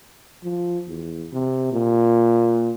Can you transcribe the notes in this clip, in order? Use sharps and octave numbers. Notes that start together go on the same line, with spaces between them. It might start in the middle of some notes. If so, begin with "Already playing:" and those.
F3
E2
C3
A#2